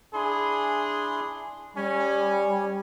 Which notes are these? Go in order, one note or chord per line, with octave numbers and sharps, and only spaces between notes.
D4 E4 G#4 C6
G3 C#4 G#5